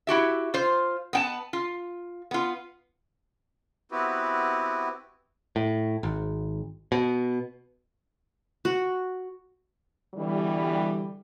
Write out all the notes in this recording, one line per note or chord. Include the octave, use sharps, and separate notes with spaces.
E4 F#4 G4 E5
F4 C5
B3 G5 A5
F4
B3 F4
B3 C4 E4 F#4 G4 B4
A2
G#1
B2
F#4
B2 D3 E3 G3